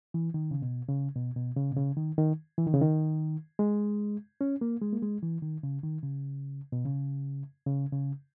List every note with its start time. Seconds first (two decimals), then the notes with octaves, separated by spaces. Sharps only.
0.14 E3
0.34 D#3
0.51 C#3
0.62 B2
0.89 C#3
1.16 B2
1.36 B2
1.57 C#3
1.72 B2
1.77 C#3
1.97 D#3
2.18 D#3
2.58 E3
2.66 D#3
2.74 C#3
2.81 D#3
3.59 G#3
4.41 C#4
4.61 A#3
4.82 G#3
4.93 A#3
5.02 G#3
5.23 E3
5.42 D#3
5.63 C#3
5.83 D#3
6.03 C#3
6.72 B2
6.85 C#3
7.66 C#3
7.92 C#3